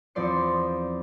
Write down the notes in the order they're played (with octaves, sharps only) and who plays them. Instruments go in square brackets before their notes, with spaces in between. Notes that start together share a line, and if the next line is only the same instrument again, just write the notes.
[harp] E2 F3 C4 D5 C6 C#7